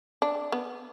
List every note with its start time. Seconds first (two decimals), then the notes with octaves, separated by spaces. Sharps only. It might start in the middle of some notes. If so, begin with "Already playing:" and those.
0.22 D4
0.52 B3